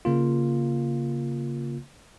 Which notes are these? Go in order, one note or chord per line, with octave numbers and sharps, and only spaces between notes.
C#3 A#3 F4